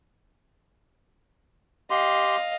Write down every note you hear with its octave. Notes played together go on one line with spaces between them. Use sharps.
G4 D#5 F5 C6